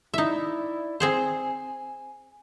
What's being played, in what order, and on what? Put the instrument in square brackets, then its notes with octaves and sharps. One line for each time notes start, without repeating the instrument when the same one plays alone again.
[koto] D#4 E5 [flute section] E4 D5
[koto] C4 G#4 C5 [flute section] G#5